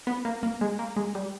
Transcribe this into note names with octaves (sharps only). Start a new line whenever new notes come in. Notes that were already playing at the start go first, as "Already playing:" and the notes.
B3
A#3
A#3
G#3
A#3
G#3
G3